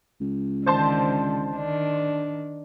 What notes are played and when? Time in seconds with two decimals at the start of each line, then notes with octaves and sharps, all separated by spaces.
0.21 C#2
0.66 D3 D#3 C5 A5 C6
1.52 D#3 D4